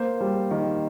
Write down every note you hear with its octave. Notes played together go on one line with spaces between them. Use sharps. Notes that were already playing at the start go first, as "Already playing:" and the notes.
Already playing: A#3 C5
G3
D#3